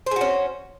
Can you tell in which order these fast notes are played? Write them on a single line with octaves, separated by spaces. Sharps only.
C5 G#4 F#4 C#4